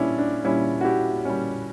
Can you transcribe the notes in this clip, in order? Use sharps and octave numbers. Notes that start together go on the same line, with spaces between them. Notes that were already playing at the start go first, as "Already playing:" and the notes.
Already playing: A#2 G3 C#4 D4 E4
D4
A#2 G3 C#4 E4
F#4
E4 G4
A#2 G3 C#4